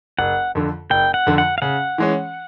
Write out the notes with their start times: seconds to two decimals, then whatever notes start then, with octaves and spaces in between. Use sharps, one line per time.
0.19 F#1 F#5
0.55 F2 D3
0.90 F#1 G5
1.14 F#5
1.27 F2 D3
1.38 F#5
1.58 F5
1.62 C#3 F#5
1.98 E3 G#3 C#4